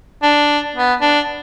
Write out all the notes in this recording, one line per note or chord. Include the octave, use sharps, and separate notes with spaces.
D4
B3
D4